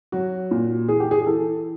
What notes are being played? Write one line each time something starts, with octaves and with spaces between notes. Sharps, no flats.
F#3 F#4
A#2
E3 G#4
G4
G#4
G#4
E3 A4